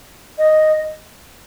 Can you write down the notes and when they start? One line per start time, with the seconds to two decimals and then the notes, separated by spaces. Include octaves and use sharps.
0.38 D#5